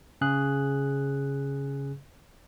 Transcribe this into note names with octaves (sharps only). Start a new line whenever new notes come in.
C#3 G#4 F#6